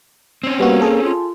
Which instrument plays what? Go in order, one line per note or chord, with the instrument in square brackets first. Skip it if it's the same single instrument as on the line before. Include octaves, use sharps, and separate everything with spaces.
[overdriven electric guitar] C4 C#4
[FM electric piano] G3 B3 F#4 [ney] A#3
[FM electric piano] G#4 A4
[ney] F4